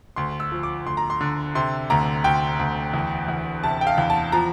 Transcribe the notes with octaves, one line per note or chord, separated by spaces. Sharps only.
D2 C6
E6
F3
D6
D2 C6
A#5
C6
D3
C3 C6
D2 A#5
D2 G5
D2
E2
E2
C3 A5
G5
F5
E2
A5
F3 A#5